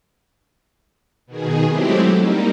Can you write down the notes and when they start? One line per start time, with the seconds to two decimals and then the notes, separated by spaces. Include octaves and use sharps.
1.26 B2 D#3 G#4
1.67 F#3 G#3 A3 C4 E4 G4
2.16 G3 A#3 D#4